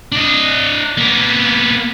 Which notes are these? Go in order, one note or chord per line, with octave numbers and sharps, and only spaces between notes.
D4 D#5
A#3 B3